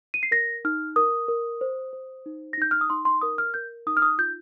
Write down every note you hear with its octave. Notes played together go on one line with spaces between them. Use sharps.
D#7
C7
A#4 A#6
D#4 F6
A#4 D#6
A#4
C5
C5
D#4
A#6
D#4 G6
F6
D#6
D#4 C6
C6
A#4 D#6
F6
A#4 G6
D#4 D#6
F6
D#6
F4 G6